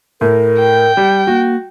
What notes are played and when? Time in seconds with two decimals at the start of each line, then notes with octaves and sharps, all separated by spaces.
0.21 A2 A#4
0.59 G5
0.97 G3
1.27 A#3 F#4